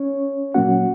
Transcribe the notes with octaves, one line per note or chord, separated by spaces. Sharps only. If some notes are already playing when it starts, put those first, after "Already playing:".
Already playing: C#4 C#5
A#2 F#3 A#3 C#4 F#4 F#5